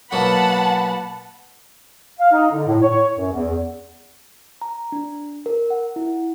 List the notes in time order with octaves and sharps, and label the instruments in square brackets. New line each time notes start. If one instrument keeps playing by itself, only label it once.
[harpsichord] B2 F#3 A#3 [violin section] F#5 A5 B5
[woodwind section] F5
D#4
D3
A2
C#5
F#2
E2
[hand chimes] A#5
D4
A#4
F#5
E4